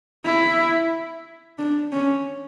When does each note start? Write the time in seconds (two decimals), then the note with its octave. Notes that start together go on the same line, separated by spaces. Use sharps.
0.25 E4
1.58 D4
1.92 C#4